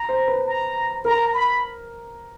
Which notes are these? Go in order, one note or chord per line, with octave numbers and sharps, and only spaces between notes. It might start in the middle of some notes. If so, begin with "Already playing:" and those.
Already playing: A#5
C5
B4
A#5
A#4 A#5
B5